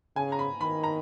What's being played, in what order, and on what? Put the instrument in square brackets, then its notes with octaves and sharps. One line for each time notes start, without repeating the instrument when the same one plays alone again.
[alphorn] C#3 [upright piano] G#5
[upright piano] A#5
B5
[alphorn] D#3 [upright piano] B5
[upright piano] A#5